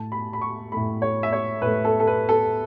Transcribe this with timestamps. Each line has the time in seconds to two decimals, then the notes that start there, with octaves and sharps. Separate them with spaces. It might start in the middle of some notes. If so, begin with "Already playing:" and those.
Already playing: A2 A3 A5
0.12 B5
0.33 B5
0.42 C#6
0.72 A2 A3 B5
1.02 C#5
1.23 E5
1.32 C#5
1.62 A2 A3 B4
1.85 A4
2.00 A4
2.07 B4
2.29 A4